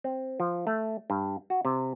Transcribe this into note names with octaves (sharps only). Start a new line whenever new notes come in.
C4
F3
A3
G2
F#4
C3